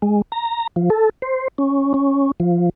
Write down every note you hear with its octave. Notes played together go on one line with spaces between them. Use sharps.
G#3
A#5
F3
A4
C5
C#4
C#4
F3